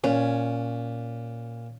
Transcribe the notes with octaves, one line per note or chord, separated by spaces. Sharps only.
A#2 C#4